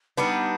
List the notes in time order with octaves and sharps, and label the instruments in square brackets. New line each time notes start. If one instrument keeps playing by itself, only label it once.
[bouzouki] G3 B3 D4 [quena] D#4